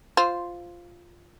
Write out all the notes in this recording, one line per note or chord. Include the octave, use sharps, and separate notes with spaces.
F4 C5